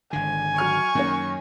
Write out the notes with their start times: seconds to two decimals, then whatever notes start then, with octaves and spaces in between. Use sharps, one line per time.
0.13 G#1 D3 G#5
0.57 F#3 C#6 F6 D#7
0.95 F#2 D#3 A#3 C#4